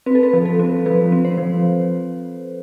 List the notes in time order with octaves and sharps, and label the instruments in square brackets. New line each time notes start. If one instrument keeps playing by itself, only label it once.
[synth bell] C4 B4
A4
B4
F3
A4
C4
F3 B4
C4
C5
F3